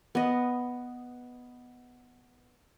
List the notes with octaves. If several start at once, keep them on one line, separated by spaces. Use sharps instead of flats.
B3 D#5